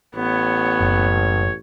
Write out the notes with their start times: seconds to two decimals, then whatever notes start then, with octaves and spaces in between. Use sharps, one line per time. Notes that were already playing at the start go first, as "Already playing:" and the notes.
0.15 A1 B3 C#5
0.80 F#1